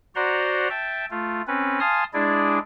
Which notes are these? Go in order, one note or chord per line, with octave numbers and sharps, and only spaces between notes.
F#4 C5 D5 F#5 A#5 C6
E5 G5 A5
A3 F4
C4 C#4 B4
F5 G#5 A5 C6 D#6 F6
G#3 D4 E4 G#4 D5